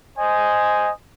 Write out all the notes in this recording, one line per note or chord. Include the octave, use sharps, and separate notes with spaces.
C5 D#5 G#5